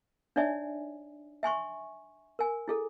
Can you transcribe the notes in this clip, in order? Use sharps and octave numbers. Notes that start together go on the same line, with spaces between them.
D4 D#4 C#5 D5 E5 G#5
E5 G#5 C6 C#6
A#4 G#5
E4 G#4 A4